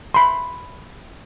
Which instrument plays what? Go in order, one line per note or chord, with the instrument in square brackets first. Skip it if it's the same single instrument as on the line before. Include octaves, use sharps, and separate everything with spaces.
[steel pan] B5 C6